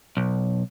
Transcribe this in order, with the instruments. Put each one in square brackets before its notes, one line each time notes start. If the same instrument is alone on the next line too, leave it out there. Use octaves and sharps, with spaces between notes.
[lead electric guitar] B1